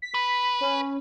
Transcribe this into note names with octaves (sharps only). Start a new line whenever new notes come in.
B6
B4
C#4